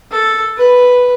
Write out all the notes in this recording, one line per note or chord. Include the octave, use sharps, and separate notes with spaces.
A4
B4